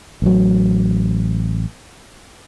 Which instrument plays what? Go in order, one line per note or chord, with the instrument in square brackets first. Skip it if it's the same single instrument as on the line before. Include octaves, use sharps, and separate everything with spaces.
[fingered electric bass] A1 F#3